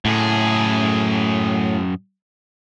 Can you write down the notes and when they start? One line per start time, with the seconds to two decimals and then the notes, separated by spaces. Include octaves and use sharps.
0.05 F#2 A2 G#4